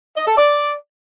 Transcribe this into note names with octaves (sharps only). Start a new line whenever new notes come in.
D#5
A4
D5